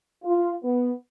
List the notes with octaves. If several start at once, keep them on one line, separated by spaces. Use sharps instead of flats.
F4
B3